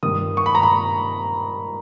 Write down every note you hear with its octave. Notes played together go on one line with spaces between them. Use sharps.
G2 D#3 D#6
C#6
B5
A#5
B5